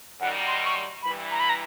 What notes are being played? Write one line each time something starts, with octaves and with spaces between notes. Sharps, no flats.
F#2 D#3 G3 F#5
C6
C#6
C6
G2 E3 G3 B5
A#5
B5
A#5